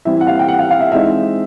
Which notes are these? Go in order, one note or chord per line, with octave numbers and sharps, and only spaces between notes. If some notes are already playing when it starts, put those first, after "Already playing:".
E3 G3 C4 E4 E5
F#5
F5
G5
F#5
F5
F5
E5
E3 G#3 C4 D#4 E5